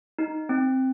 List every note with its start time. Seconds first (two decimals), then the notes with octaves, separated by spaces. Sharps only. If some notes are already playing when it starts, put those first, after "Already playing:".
0.19 D#4
0.49 C4